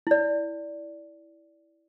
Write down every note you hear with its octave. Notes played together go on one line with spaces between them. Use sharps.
E4 D5